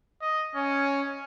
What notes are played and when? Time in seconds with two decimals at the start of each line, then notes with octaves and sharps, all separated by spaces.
0.21 D#5
0.55 C#4